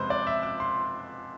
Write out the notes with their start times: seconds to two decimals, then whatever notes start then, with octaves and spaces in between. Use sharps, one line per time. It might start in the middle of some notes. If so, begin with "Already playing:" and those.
Already playing: F2 C3 F3 G#3 B4 C5
0.10 D5
0.27 E5
0.43 D6
0.60 C6